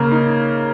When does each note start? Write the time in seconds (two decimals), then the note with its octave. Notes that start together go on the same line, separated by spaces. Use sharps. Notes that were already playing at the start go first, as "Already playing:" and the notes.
Already playing: C#3 A#3
0.11 D#4